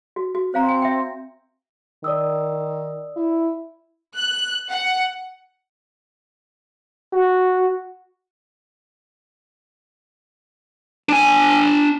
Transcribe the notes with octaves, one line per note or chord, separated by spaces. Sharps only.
F#4
F#4
C4 C5 F5 A#5
G#5
E5 G5
D#3 D5 D#6 E6
E4
F#6
F#5
F#4
D4 G#5